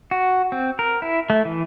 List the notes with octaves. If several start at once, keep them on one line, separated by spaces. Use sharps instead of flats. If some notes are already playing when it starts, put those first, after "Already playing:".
F#4
C4
A#4
E4
A3
E3